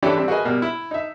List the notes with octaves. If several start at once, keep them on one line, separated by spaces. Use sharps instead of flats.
E3 C#4 D4 E4 G4 A4
G3 C4
F#4 G#4 A#4 B4 D#5 G#5
B2 G3 A#3
E4
D#4 E5